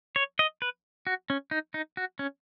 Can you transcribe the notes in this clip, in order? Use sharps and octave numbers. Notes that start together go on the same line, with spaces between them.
C#5
D#5
B4
F#4
C#4
D#4
D#4
F#4
C#4